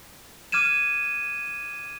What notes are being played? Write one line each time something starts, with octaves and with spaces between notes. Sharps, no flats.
D6 F6 G#6 D#7 E7